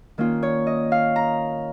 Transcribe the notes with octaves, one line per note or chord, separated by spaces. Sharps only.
D#3 A#3 C#4 F4
C#5
D#5
F5
A#5